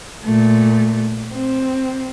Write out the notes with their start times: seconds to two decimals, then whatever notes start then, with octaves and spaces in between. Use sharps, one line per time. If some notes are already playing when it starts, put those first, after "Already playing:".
0.25 A#2 A3
1.34 C4